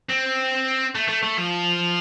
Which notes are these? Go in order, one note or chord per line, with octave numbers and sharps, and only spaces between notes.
C4
A3
A3
A3
F3